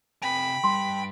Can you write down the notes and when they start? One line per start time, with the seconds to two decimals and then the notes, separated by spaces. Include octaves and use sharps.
0.22 C3 G5 G#5 B5
0.64 G2 C6